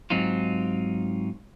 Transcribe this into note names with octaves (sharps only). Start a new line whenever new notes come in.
G#2 F#3 C4 D#4 F4